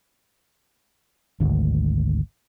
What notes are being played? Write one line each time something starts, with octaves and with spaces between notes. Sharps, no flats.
G#1 D2